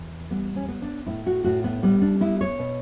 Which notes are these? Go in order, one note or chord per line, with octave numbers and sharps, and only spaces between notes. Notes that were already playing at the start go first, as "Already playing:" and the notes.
Already playing: E2
G3 B3
C#4
B3
D4
A2 E4
F#4
A2 F#4
B3
G3 B3
D4
B3 E4
C#5
B2